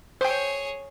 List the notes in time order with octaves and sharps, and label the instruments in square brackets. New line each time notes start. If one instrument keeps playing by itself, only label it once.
[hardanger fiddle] G#4 C#5 [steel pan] C5 G5